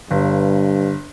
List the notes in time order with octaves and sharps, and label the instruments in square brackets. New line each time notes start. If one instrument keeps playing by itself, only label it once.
[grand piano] G1 [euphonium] G2